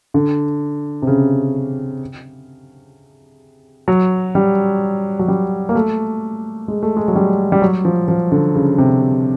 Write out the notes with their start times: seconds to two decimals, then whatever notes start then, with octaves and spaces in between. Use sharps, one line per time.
0.14 D3
1.02 C3
1.07 C#3
3.88 F#3
4.35 G3
5.19 F#3
5.28 G3
5.69 A#3
5.75 A3
6.68 G#3
6.83 A3
6.97 G#3
7.08 F#3
7.15 G3
7.52 G3
7.62 F#3
7.85 F3
8.08 F3
8.32 D3
8.55 C#3
8.78 C3